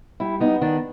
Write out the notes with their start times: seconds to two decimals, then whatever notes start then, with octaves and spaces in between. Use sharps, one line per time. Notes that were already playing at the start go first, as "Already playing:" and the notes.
0.20 G3 E4
0.40 B3 D#4
0.61 D#3 D4